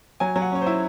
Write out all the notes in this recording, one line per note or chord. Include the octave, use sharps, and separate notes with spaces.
F#3 G#5
F#3
F#5
C#4 C#5
C5
E4